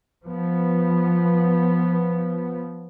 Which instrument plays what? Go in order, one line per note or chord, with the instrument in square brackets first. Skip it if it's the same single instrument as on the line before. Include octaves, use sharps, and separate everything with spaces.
[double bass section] F3 B3